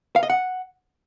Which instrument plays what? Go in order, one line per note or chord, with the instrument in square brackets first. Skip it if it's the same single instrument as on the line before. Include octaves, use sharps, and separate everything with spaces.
[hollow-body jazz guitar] F5
D#5
F#5